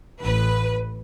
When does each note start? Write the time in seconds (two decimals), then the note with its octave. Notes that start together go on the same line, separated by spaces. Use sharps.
0.21 A1 B4